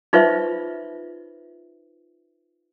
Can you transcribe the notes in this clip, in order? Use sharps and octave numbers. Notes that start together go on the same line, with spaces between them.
D#4 F4 B4 C5 E5